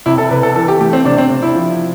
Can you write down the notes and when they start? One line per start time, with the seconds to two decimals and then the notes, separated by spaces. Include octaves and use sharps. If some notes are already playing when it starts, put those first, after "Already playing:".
0.06 C3 E4
0.18 A4
0.31 C3 B4
0.43 A4
0.56 E3 A4
0.68 G4
0.80 A3 G4
0.93 C4
1.05 C3 D4
1.18 C4
1.30 C3
1.42 E4
1.55 F3